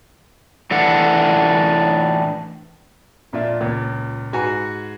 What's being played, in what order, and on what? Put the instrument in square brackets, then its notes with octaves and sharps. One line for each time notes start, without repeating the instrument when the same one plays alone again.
[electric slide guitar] A2 E3 D4 A4 F#5
[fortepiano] F2 A#2 D4 F4 D5 E5
C#2 A#2
G#2 F#4 B4 G#5 A#5